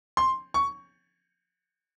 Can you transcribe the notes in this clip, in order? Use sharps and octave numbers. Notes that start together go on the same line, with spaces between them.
C6
C#6